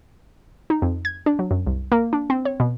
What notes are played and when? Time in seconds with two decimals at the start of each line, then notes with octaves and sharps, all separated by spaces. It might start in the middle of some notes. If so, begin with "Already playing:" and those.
0.70 D#4
0.82 F2
1.05 G#6
1.26 D4
1.39 F#3
1.51 F#2
1.67 C2
1.92 A#3
2.13 D4
2.30 C4
2.45 C#5
2.60 B2